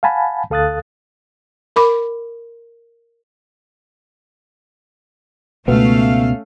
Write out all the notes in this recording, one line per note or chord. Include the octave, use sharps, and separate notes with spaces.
F5 F#5 G#5 A5 B5
D2 A4 F5 D#6 F#6 A6
A#4 B5 D6
C#2 B2 A3 B3 C#4 F5